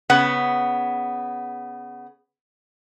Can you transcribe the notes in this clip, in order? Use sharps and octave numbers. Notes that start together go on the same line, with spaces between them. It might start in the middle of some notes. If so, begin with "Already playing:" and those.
C#3 B3 F#5